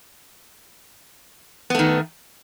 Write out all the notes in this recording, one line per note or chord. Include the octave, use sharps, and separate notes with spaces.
D#3 A3 B3